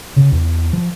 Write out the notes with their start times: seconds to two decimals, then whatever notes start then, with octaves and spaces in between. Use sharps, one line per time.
0.16 C#3
0.32 E2
0.73 F3